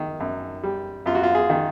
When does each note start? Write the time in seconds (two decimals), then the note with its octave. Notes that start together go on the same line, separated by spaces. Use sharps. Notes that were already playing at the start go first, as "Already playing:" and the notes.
Already playing: D#3
0.20 F#2
0.63 G3
1.06 F#2 F4
1.15 F#4
1.23 F4
1.35 G#4
1.50 D#3